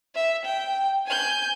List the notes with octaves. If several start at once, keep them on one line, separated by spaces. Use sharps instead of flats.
E5
G5
G#5 G6